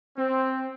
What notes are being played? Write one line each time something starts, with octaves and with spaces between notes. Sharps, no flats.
C4